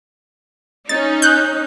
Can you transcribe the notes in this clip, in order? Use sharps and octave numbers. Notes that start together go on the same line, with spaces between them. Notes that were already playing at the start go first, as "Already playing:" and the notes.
C#4 D#4 A6
F#6 G6